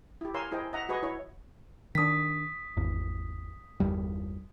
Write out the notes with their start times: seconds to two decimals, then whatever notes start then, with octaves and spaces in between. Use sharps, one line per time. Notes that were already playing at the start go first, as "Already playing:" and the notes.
0.21 E4 G4
0.34 A#4 C#5 F5 G#5 C6 E6
0.52 E4 G#4 C5 D#5 G5
0.73 D#5 E5 F#5 A#5
0.89 F#4 G#4 B4 D#5 C#6
1.03 E4 C#5
1.95 D#3 D4 D#6 B6
2.77 G#1 E2
3.80 G1 E2 G3